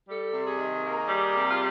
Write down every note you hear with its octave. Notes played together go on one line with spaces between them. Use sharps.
G3 A4
C3
G#4
D#3
A#3
G3
C3
F4